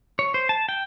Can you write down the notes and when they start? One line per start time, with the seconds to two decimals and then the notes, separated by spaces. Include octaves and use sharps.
0.19 C#5
0.34 C5
0.49 A5
0.69 G5